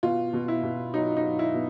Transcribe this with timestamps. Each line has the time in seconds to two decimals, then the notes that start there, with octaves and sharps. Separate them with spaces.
0.03 B2 F4
0.33 B2
0.48 E4
0.63 B2
0.94 F#3 D#4
1.16 D#4
1.24 F#3
1.39 E4
1.54 B2